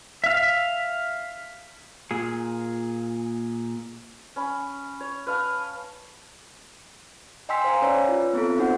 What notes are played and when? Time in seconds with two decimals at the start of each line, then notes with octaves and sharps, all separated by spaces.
0.24 E5 F5
2.11 A#2 G#4
4.36 C#4 B5
5.01 C#5
5.27 B4 F5 A5 C#6
7.49 D#5 G5 G#5 C6 E6 B6
7.64 C5 F5 G#5 A#5
7.82 C#4 B4 C#5 D5 A#5
8.09 F4 B4
8.33 B3 C4 F4 A4
8.57 B3 D4 D#4 F#4 C5 F#5